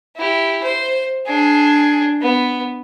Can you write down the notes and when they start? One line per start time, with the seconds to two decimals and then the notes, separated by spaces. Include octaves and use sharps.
0.17 E4 G4
0.64 C5
1.26 D4 G#4
2.22 B3